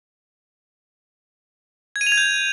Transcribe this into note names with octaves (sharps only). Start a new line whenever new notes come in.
G#6
D#7
F7
G#6
G6